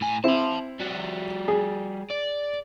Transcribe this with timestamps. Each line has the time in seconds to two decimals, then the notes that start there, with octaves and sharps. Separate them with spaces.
0.01 A2 G#5
0.24 C4 E4 A5 C6
0.80 G3 F#4
1.48 G#4
2.10 D5